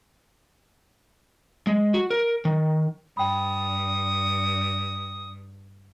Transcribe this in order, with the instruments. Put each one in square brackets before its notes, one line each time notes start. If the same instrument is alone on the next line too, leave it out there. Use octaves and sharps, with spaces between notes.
[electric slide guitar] G#3
F#4
A#4
D#3
[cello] G2 [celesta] G5 B5 [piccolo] D#6